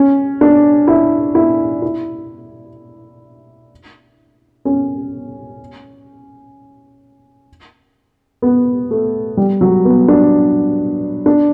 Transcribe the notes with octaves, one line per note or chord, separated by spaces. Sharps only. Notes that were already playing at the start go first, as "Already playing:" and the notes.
Already playing: C#4
D4
E4
E4
E4
C#4
B3
A3
G3
F#3
B3
D4
D4